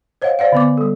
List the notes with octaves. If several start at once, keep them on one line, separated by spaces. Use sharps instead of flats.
C5 C#5 D#5 F5 F#5
C5 D5 F5 F#5
D3 B3 D6
G3 A4